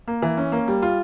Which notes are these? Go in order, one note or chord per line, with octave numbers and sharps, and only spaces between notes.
A#3
E3
C#4
A#3
G3
F4